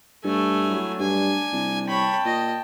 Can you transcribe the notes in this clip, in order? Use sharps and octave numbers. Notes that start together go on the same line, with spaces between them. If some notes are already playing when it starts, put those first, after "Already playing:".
G2 A3 G#5
F#3 E4
G2 D4 G#5
C2
C#5 G5 A5 B5
A#2 D#5